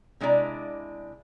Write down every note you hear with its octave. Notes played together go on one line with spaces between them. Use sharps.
C3 G#3 D4 E4 D5 A#5